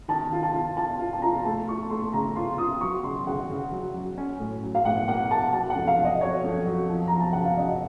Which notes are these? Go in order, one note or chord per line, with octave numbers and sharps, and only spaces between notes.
D#3 A5
F4
A5
F4
F4 A5
F4
A5
F4 A#5
A3 A5
F4 C#6
A3 C6
C#3 A#5
F4 C6
F4 D#6
F#3 C#6
C#3 C6
C#3 F#5
C#3
F#3
F#3
C#4
A2
F#3
F5
A2 F#5
A#3 F#5
A#3 A5
F#3 A5
F#5
F2
F5
F2
D#5
F#3 C#5
F2
F#3
F3
F3 A#5
A5
C#3 F#5
F5
F#2 D#5